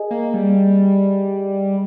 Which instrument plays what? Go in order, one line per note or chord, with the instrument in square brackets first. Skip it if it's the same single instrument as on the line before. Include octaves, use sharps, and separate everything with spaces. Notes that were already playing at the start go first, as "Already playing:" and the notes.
Already playing: [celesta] G#4 D#5 G#5
[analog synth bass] A#3
G3